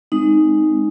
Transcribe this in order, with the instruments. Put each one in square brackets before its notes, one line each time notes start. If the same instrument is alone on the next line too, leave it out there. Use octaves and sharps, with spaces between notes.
[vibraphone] G#3 C4 D#4